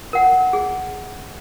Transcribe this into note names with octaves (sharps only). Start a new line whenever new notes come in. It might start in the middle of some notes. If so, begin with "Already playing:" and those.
A#4 F#5
G#4